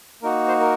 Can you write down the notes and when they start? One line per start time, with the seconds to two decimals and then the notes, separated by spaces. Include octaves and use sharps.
0.22 A#3 D#4 F#4 A#4
0.48 C5
0.60 A#4